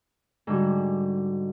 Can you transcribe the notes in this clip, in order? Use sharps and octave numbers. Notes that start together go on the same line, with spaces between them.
G#2 D3 G3 F#4